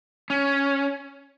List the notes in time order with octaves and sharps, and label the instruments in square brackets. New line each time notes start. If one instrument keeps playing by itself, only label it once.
[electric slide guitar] C#4